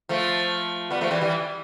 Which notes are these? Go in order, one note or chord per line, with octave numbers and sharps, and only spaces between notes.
F3 A3
G3 B3
F3 A3
E3 G3
E3 G3